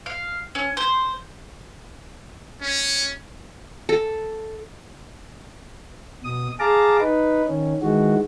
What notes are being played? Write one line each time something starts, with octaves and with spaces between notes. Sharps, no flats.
F5
C#4
C5
C#4
A4
B2 D#6
G#4 F5 A5 A#5 D6
D#4 B4
D#3 C#4
D#3 E3 G#3 F#4